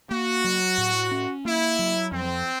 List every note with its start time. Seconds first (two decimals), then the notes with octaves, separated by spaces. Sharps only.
0.11 A#3 F#4
0.44 F#3
0.78 A2
1.11 C#4
1.45 A#3 E4
1.79 F#3
2.12 F2 C4